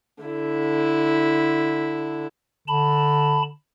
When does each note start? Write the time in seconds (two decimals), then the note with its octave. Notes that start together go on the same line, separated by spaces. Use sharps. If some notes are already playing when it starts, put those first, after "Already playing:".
0.23 D3 E4
2.68 D3 A5 B5